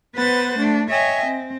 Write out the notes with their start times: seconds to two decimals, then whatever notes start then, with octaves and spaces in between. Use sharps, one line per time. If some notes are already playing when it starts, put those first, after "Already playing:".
0.16 B3 B4 C5 F#5 A6
0.58 A3 D4
0.89 C#5 D#5 E5 G5 G#5
1.26 C4